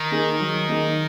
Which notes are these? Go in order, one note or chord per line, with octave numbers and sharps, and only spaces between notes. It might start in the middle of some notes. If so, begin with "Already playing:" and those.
Already playing: D#3
A#3 D#4 G#4
F#3
A#3 D#4 G#4